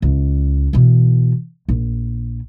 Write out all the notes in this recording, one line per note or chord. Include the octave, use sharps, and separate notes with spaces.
C#2
B2 E3
A#1